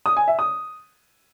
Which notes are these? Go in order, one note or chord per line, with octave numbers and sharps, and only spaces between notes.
D#6
G#5
E5
D#6